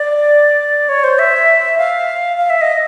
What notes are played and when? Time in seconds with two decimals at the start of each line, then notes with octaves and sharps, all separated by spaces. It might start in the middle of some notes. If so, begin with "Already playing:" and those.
Already playing: D5
0.89 C#5
1.04 C5
1.19 E5
1.78 F5
2.37 F5
2.50 E5
2.61 D#5